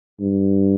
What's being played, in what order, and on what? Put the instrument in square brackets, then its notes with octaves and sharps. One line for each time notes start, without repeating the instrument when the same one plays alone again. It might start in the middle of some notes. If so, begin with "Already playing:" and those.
[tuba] G2